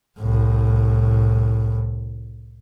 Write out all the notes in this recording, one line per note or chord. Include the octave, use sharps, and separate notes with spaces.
C2 A2